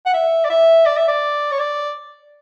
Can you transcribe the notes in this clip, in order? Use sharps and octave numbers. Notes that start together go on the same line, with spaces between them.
F#5
E5
D5
E5
D5
E5
D5
C#5
D5